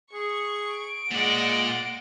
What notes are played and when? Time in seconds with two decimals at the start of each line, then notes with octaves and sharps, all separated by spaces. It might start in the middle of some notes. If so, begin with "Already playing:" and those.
0.13 G#4 C#6
0.73 D7
1.12 A#2 G#3 D5 F#5 A#6